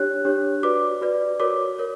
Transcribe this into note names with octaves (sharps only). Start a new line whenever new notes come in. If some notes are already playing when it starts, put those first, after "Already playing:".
Already playing: D4 G4 C#5 F#6
D4 G4 C#5
F#4 B4 D5 D6
F#4 B4 D5
F#4 A#4 C#5 D6
A#4 C#5